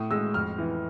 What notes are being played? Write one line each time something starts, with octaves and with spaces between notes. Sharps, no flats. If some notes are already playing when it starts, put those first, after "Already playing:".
Already playing: A2 D#6
G#3 E6
F2 F6
E3